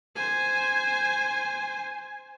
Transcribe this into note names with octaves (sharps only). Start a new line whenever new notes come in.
C5 G#5